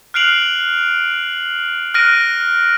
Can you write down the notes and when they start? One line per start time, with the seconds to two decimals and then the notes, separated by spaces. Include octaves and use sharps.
0.14 F6 F#6 C7 D7 F7 F#7
1.94 F6 F#6 A#6 D7 D#7